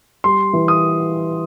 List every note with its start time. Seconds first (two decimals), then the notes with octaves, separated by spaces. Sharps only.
0.24 G3 C6
0.53 E3
0.68 D#6